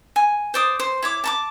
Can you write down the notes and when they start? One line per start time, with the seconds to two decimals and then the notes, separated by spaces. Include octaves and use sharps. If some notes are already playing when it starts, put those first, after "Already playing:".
0.16 G#5
0.54 C5 D5 D#6
0.80 C5
1.02 E4 C#5 D6
1.24 A5 A#5 D6